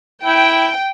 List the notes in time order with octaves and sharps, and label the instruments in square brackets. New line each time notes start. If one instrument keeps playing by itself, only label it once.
[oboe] E4 [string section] G5